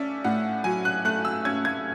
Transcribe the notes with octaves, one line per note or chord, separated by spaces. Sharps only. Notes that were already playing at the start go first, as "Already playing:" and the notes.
Already playing: A3 C#4 D5 E5
A2 F#5
F#3 G#5
F#6
A3 F#6
E6
C#4 G#6
G#6